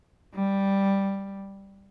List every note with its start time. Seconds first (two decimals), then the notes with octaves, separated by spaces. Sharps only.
0.34 G3